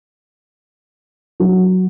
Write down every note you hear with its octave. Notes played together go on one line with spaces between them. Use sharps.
F#3